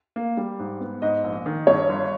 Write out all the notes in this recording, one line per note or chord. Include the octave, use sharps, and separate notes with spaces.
A#3
G3
G#2
B3
G#2 D#5
A#1
D#3
G2 C#5
G1